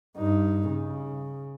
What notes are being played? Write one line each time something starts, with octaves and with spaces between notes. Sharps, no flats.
G2 D#4
C#3